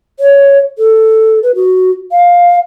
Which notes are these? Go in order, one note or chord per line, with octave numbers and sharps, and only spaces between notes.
C#5
A4
B4
F#4
F5